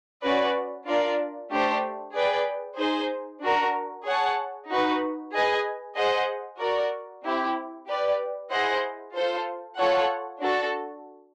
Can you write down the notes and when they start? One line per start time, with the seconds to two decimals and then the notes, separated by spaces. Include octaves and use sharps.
0.23 C#4 F#4 B4 D5
0.86 D4 F4 A#4 D5
1.50 A3 D4 G4 C5
2.14 G#4 B4 D5 G5
2.78 D#4 G#4 C5
3.41 D4 F#4 A#4
4.05 G#4 C#5 F#5 A5
4.69 D#4 F#4 B4
5.32 G#4 B4 D#5 G#5
5.96 G#4 C5 D#5 F#5
6.60 F#4 A#4 D5
7.24 C4 E4 G4
7.87 G4 B4 D5
8.51 E4 G#4 C5 D#5 F#5
9.15 F4 A4 C5
9.78 F4 A4 C#5 F#5
10.42 D4 F#4 A4